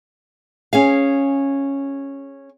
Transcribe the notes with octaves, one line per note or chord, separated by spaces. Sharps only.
C#4 G#4 F5